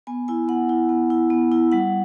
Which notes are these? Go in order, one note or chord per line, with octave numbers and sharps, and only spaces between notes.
B3 G#5
E4 G#5
B3 F#5
E4
B3
E4
B3
E4
G3 F#5